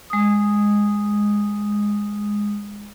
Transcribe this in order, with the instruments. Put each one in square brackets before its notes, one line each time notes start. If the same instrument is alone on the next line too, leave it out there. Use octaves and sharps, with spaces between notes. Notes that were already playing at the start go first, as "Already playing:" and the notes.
[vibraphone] G#3 D#6